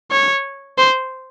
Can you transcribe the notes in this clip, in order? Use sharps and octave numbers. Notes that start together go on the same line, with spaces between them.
C#5
C5